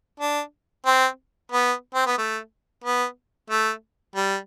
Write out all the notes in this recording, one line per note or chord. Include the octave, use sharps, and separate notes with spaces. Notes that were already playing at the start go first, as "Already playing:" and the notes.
D4
C4
B3
C4
B3
A3
B3
A3
G3